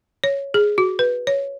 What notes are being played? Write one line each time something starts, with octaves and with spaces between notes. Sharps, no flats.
C#5
G#4
F#4
B4
C#5